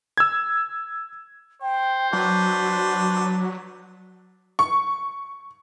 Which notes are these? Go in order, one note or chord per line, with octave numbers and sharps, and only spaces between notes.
E6 G#6
C5 G5
F#3 D4 F#4 B4
C#6